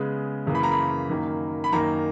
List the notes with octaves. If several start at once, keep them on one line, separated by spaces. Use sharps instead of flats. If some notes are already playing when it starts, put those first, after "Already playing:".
Already playing: C#3 G#3 B3
F#2 C#3 E3 A#3
B5
A#5
B5
F#2 D#3 A#3
B5
F#2 D#3 A#3 A#5